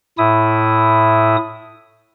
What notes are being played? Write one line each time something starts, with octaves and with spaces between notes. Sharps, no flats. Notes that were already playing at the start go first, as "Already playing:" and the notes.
A2 E4 D#6